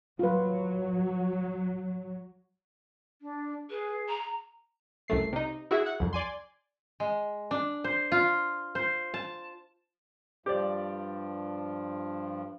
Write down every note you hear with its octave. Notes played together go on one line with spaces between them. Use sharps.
F#3 F4 B4
D4
G#4 B4
A#5
C2 F#2 A3 C7
C3 D#4
E4 F#4 G#4 E5
F#5
C2 F2
D5 G#5 C6
G#3
D4
C5
F4
C5
A5
G2 F3 G4 C5 D5